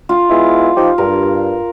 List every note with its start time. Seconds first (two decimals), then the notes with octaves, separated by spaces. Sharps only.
0.09 F4
0.30 G#3 B3 E4
0.76 F3 D#4 G4
0.98 G2 A#4